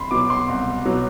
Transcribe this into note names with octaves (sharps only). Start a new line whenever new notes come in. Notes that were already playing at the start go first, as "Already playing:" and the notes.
Already playing: C2 B5 C6
B2 F#3 D6
D6
C6
C2
B2 F#3